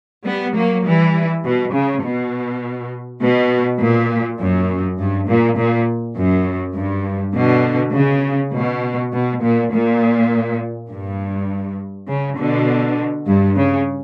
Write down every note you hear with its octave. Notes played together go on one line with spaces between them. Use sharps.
G3 B3
F#3 A#3
E3 G3
B2
C#3
B2
B2
A#2
F#2
G2
A#2
A#2
F#2
G2
B2 D3
C#3
B2
B2
A#2
A#2
G2
C#3
B2 D3
G2
C#3